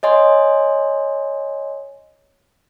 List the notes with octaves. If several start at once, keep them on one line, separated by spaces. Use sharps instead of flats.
C#5 D#5 G#5 C6